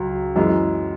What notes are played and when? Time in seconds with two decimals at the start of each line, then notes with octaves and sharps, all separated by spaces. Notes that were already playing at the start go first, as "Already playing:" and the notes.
Already playing: C#2 F#3
0.36 F#2 E3 G#3